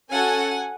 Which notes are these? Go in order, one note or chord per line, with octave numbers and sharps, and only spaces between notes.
C#4 F#4 A4 F#5 G#5